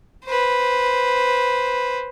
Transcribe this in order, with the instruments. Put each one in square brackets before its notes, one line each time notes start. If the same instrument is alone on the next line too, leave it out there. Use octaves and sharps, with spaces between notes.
[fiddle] B4 C5